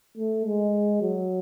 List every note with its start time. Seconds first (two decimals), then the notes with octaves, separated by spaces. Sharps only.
0.18 A3
0.45 G#3
1.02 F#3